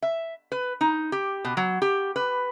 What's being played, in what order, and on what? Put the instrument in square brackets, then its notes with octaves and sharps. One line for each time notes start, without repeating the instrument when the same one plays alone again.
[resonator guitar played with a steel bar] E5
B4
D#4
G4
B2
F#3
G4
B4